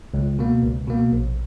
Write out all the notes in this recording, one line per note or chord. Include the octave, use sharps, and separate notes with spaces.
C#2
B2 A#3
C#2
B2 A#3
A#1